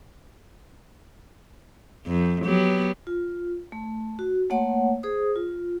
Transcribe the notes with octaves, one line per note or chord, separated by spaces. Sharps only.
F2
F#3 B3 G4
F4
A3
F#4
A3 A#3 C#5 F#5
G#4 C5 D#6
F4